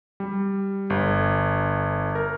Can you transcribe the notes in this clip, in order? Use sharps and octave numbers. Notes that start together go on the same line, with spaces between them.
G3
G1
A#4